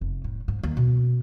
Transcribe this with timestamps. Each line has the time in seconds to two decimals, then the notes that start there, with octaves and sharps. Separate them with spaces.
0.01 F1
0.24 A2
0.48 G#2
0.63 D#2
0.77 B2 C#4